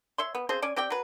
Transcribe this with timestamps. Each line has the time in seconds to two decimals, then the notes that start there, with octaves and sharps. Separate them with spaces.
0.18 C#5 E5 C6
0.35 B3
0.49 C#3 C4 G#4 C5
0.62 C#4 D5 G#5
0.76 C4 G4 D5 G5
0.90 F#3 B4